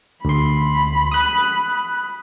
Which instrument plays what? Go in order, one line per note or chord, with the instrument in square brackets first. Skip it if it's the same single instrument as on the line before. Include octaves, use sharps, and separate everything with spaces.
[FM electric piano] D2 C6 [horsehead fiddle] B5
[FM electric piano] D#6 F#6